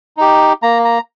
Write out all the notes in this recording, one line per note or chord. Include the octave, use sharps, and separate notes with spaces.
D#4 G4
A#3 A#5
A#5